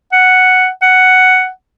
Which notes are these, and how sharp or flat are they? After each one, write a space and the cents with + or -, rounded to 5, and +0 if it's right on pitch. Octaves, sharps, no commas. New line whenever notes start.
F#5 +0
F#5 +5